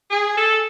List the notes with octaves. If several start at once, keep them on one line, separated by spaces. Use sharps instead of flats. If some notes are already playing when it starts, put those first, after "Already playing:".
G#4
A4